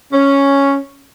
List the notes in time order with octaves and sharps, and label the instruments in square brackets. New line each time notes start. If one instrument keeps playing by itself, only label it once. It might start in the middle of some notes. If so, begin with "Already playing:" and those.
[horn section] C#4